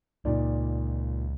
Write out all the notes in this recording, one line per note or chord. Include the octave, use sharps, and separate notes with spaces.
C#2 A#2 D#4 D5